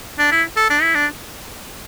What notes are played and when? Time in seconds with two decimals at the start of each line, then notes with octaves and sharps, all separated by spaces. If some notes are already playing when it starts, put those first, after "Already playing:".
0.19 D4
0.32 E4
0.57 A4
0.70 D4
0.82 E4
0.95 D4